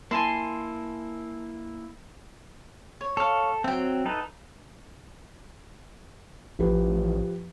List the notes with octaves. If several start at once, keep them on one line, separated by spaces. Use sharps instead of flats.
A#3 E4 G#5 A5 C6
C#5
A4 C#5 F5
F#3 C4 E5 G5
D#4 A4 B4
A1 F3 G4 B4